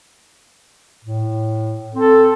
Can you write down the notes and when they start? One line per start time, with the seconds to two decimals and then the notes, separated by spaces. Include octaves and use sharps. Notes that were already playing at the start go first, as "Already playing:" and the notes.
1.04 A2
1.95 C4 A4